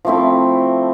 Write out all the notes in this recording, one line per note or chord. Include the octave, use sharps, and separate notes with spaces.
F3 A3 C4 E4